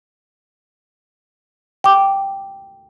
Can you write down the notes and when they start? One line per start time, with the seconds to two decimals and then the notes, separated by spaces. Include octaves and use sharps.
1.84 G5 D6